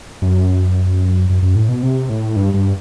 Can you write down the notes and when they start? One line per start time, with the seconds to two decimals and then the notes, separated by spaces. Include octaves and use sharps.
0.22 F#2
1.30 F#2
1.42 F#2
1.56 A2
1.69 B2
1.83 C3
2.09 A2
2.36 G2
2.54 G2